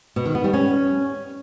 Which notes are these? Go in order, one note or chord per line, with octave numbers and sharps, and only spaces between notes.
B2
D#3
B3
G3
C#4